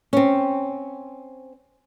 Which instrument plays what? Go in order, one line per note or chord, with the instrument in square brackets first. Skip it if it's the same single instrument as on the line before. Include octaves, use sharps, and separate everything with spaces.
[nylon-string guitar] C4 C#4